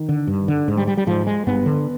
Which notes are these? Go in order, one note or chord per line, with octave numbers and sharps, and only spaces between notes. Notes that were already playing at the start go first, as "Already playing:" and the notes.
Already playing: D#3
D3
G2
D3
G#2
G3
G3
G3
G#2 F3
G#3
G2 B3
D3